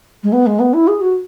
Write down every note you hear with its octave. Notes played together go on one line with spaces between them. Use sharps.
G#3
B3
G#3
B3
E4
G#4
F#4